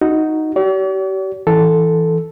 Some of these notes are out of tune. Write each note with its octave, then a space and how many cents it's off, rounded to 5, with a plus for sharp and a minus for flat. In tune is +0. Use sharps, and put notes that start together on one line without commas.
D#4 +5 F#4 +0
G4 -40 D5 -45
E3 -5 A4 +0